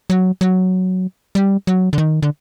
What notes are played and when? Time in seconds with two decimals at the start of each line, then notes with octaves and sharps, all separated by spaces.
0.10 F#3
0.41 F#3
1.35 G3
1.67 F#3
1.93 D3
1.98 D#3
2.23 D3